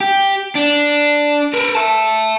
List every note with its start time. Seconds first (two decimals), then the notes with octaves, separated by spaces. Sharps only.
0.01 G4
0.55 D4
1.53 A#4 B4
1.75 E5 A5